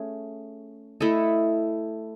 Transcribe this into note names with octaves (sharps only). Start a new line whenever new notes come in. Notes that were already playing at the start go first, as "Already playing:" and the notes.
Already playing: A3 C#4 G#4
A3 E4 A4 D#5